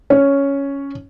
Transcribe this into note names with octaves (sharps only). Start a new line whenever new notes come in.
C#4 C#5